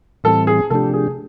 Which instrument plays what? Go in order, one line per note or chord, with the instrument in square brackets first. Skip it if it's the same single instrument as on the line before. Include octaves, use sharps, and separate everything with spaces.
[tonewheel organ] A2 E3 G3 C4 [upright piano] A4
[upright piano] G#4
[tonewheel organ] C3 F3 A3 D4 G4 [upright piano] A4
[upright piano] G#4